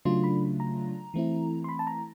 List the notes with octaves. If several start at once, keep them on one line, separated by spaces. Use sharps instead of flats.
C#3 F#3 A3 D4 F4 C6
B5
A#5
E3 A3 C4 E4
C6
B5
A5
A#5